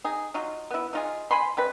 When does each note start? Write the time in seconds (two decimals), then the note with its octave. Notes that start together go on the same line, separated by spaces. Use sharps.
0.04 D#4 G#4
0.34 F#3 D#4 F4
0.71 B3 E4
0.93 D#4 F4 G#4
1.31 C5 G#5 B5 C6
1.57 C3 G3 B4